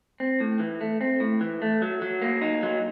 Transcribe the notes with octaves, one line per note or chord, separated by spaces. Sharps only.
C4
A2
E3
A3
C4
A2
E3
A3
F#3
F#3
A#3
D#4
F#3